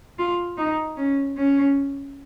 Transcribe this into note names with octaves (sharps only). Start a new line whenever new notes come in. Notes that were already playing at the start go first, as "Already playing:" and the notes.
F4
D#4
C#4
C#4